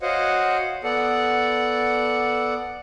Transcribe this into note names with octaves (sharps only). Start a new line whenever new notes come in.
F#4 C5 C#5 D#5 F5 F#5
B3 A4 D5 F#5